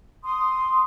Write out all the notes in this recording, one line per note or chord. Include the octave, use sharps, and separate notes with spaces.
C6 D#6